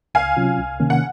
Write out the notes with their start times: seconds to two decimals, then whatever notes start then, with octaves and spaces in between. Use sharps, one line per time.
0.14 C#2 F5 G#5
0.37 C3 F#3 C#4 F4
0.58 C2
0.80 C3 D#3 A#3 C#4
0.90 F#5